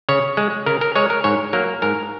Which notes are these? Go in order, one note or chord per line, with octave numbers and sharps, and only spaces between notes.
C#3 C#5
G#3
C#3 A#4
A#4
G#3 C#5
A#4
G#2 C#5
F#3 A#3 A#4
G#2 A#4